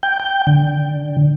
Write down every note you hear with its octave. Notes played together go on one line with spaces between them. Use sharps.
G5
G5
D3